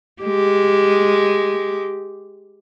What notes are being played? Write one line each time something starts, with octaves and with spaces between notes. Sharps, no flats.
G#3 G4